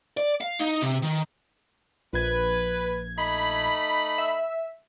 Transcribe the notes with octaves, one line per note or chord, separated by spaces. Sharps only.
D5
F5
D#4
C3
D#3
A#1 B4 G#6
A3 D#4 B5
E5